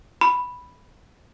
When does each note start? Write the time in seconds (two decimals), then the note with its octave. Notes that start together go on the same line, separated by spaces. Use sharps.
0.21 B5